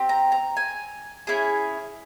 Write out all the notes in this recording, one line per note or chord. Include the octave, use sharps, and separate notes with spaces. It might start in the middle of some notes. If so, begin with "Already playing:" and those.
Already playing: C4 G4
A#5
A#5
G#5
C#4 E4 G#4